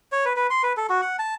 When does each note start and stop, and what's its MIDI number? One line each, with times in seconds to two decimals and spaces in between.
0.12 0.25 73
0.25 0.33 71
0.36 0.47 71
0.50 0.62 84
0.63 0.73 71
0.77 0.87 69
0.90 1.01 66
1.01 1.16 78
1.19 1.35 81